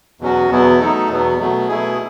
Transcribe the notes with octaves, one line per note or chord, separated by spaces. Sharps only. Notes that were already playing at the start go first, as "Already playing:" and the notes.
E2 B2 F#3 C#4 F#4
E2 B2 F#3 B3 E4
F#3 A3 D#4 A4
E2 B2 F#3 B3
B2 F#3 A3
B2 A3 E4 G#4